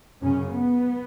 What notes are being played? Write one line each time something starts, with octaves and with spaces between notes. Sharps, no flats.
F#2 C#3 C#4
B3